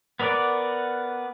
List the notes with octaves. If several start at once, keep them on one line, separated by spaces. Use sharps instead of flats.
B3 A#4 D5 F#5 D6